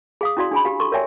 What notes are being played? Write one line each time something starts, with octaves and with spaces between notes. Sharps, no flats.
G#4 F5 D#6
C#4 E4 F#4 D5 F5 C6
D4 G#4 G#5 B5
G4 F5
A4 C6 C#6
A#4 C#5 D5 E5 G5 G#5